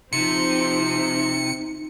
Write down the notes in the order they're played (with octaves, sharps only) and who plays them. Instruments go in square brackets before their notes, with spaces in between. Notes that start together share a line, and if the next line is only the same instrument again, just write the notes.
[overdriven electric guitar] C3 [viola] F3 C4 [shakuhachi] D#4 [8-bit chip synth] C#7